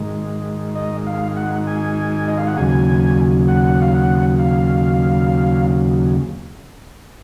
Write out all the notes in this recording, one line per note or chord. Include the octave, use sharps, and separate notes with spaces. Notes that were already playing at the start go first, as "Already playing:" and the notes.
Already playing: G#2 D#3 G#3
D#5
F5
F#5
G#5
D#5
F5
F#5
D#2 C#3 F#3 G#5
F#5
F5
F#5
F5